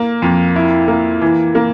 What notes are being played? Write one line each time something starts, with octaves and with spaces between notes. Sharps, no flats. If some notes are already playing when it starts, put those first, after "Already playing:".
Already playing: A#3
F2
E4
A#3
E3
A#3